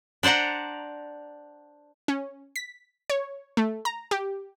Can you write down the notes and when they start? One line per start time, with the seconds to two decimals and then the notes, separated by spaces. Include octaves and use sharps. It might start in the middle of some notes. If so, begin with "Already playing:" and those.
0.23 D4 C5 D5 F#5 A#5
2.08 C#4
2.56 B6
3.10 C#5
3.57 A3
3.85 A#5
4.11 G4